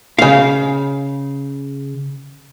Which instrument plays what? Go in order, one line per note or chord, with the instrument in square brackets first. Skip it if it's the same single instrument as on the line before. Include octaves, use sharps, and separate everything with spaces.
[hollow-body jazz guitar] C#3 F5